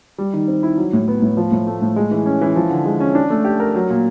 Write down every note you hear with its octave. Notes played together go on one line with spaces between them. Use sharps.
G3
D#3
C4
E4
F#3
A2
B3
A2
F3
A2
A3
A2
G#3
E3
C#4
E3
F3
D3
G#3
C#4
D4
A3
G4
A#4
F#3
A#2